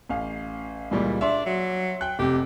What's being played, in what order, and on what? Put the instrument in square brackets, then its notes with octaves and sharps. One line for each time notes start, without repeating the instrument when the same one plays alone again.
[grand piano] A1 F5
[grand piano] C#2 A#2 G3 [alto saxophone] E3
[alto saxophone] D4 [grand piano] E5 C6
[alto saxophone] F#3
[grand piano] G5 F#6
[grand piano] F1 C3 [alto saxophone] G4